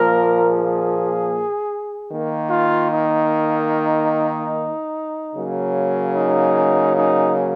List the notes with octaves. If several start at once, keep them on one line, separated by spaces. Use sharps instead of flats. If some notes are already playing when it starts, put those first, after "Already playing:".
Already playing: A#2 F3 A#3 A#4
G#4
D#3 A#3
F4
D#4
C#3 F#3 A#3
D#4
D#4